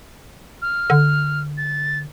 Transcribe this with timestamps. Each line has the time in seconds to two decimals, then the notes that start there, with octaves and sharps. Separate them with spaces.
0.62 F6
0.90 D3
1.58 A6